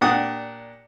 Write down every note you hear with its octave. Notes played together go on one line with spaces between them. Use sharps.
A#2 D4 G4 F#5 D#6